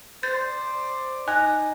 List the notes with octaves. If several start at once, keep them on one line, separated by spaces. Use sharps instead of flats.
C5 D5 G6 A6
D#4 G#5 F#6